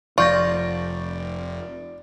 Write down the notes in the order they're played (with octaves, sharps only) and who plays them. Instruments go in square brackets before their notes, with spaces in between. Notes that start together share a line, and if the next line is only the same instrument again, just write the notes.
[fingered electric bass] F1 F3 [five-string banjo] F4 [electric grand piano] D5 [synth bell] C#6 G6 A#6